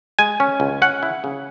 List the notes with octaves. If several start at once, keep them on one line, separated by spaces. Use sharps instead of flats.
G#3 G#5
C#4
C#2
C#4 F#5
E4
C#3